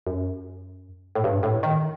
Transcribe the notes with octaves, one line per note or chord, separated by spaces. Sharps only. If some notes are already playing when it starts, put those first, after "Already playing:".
F#2
A2
G2
A2
D#3